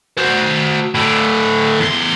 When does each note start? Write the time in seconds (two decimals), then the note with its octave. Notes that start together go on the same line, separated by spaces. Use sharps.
0.18 F#4 C5
0.95 A2 D3
1.80 E2 C6